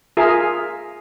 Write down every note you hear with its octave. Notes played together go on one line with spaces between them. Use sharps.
F4 G#4 A#4 E5 F5